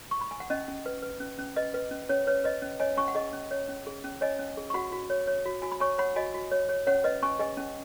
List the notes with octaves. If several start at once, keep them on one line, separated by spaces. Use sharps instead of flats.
C#6
B5
G#5
F#5
C#4 D#5
C#4
B4
B4
C#4
C#4
B4 D#5
B4
C#4
C#4 C#5
B4 C#5
B4 D#5
C#4
C#5 D#5 G#5
C#4 G#5 C#6
F#5
G#4 D#5
C#4
C#5
C#4
G#4
C#4
C#5 D#5 G#5
C#4
G#4
C#6
F#4 F#5 B5
F#4
C#5
C#5
F#4
F#4 G#5
B5
C#5 G#5 C#6
C#5 F#5 B5
F#4 D#5 G#5
F#4
C#5
C#5
C#4 C#5 F#5
B4 D#5
C#4 G#5 C#6
G#4 D#5 G#5
C#4